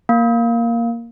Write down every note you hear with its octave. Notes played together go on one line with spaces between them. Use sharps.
A#3